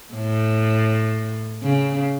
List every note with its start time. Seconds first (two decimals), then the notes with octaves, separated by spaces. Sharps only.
0.14 A2
1.63 C#3